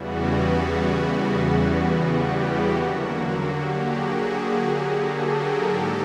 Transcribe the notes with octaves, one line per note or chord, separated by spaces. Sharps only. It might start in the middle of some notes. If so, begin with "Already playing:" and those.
Already playing: E2 C#3 E3 G3 B3 F#4
F#4
G4
F#4
D3 F#3 A#3
G4
F#4 G#4
G4 A4
G#4 A#4
G#2 D#3 F#3 G4 A4